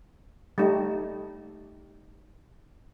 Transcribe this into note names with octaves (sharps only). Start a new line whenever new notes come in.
G3 A3 D#4